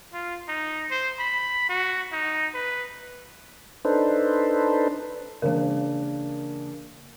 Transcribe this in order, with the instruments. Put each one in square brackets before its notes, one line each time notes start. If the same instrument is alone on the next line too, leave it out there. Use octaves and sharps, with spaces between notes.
[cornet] F4
D#4
C5
B5
F#4
D#4
B4
[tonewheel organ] D4 D#4 A4 B4 C5
[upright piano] C#3 A#3 D4 [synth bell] E3 A#4